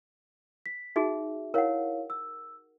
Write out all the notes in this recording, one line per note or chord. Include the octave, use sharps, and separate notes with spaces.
B6
D#4 F#4 G#4 E5
E4 A#4 C#5 F5 F#5
E6